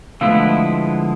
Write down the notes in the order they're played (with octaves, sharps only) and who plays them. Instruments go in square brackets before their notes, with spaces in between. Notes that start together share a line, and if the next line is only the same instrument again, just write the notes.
[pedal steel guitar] D3 F3 G#3 B3 E4 [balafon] A3